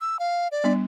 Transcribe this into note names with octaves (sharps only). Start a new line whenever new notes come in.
E6
F5
D5
G3 B3 D4